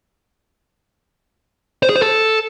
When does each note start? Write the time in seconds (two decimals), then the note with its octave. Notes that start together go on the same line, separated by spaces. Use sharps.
1.83 C5
1.89 G#4
1.96 C5
2.02 A4